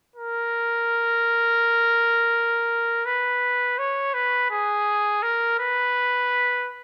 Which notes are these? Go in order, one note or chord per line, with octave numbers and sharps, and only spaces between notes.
A#4
B4
C#5
B4
G#4
A#4
B4